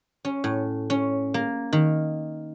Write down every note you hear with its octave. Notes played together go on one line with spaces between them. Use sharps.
C#4
A2
C#4
A#3
D#3